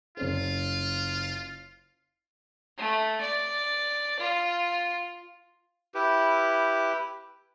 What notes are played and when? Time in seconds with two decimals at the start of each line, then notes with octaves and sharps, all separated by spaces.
0.17 F#1 C#4 F4 C5
2.78 A3
3.21 D5
4.20 F4
5.94 E4 G4 B4